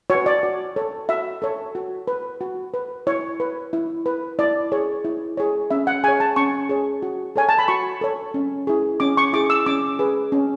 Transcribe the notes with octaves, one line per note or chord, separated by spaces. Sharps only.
F#4 B4 C#5
D5
F#4
A4 C#5
F#4 E5
A4 C#5
F#4
B4
F#4
B4
E4 C#5
B4
E4
B4
E4 D5
G#4 C#5
E4
G#4 C#5
C#4 E5
F#5
G#4 C#5 G#5
A5
C#4 C#6
G#4 C#5
F#4
A4 C#5 G#5
A5
B5
F#4 C#6
A4 C#5
C#4
E4 G#4
C#4 D6
C#6
E4 G#4 D6
E6
C#4 D6
G#4 B4
C#4